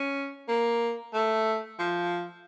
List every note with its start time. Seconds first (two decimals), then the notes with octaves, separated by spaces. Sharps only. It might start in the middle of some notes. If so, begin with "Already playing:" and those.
Already playing: C#4
0.48 A#3
1.14 A3
1.79 F3